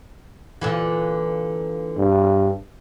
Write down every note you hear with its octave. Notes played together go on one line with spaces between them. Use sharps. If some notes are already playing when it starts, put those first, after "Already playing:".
A#2 D3 E3
G2